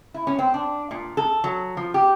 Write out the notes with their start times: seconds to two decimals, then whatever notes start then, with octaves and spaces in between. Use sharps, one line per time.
0.14 E4
0.27 C#4
0.39 C4
0.54 D4
0.91 A#2
1.17 A4
1.44 F#3
1.77 F3
1.94 G4